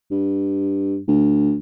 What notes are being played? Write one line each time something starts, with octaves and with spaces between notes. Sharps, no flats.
G2
D2